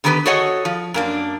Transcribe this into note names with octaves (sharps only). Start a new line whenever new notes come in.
D3 D#3 B3 G4 G#4 B4
F#4 G#4 A4 C#5 D#5 F#5
F3
F#2 A#3 D4